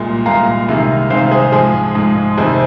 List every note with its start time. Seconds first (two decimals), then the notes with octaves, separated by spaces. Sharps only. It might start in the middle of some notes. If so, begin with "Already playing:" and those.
Already playing: C2 A#2 G#3 C6
0.26 C2 A#2 G#3 F5 A#5
0.68 C2 C3 D#3 G#3
1.10 C2 C3 D#3 G#3 C5 F5
1.31 G#4 C5
1.52 G#2 F3 G#3 G#4
1.95 G#2 F3 G#3
2.37 F2 C3 D#3 G#3 G#4 C5